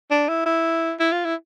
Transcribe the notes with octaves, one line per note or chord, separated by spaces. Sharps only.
D4
E4
E4
E4
F4
E4